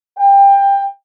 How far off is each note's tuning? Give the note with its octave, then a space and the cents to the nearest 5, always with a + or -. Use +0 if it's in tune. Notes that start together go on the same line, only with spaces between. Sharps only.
G5 +20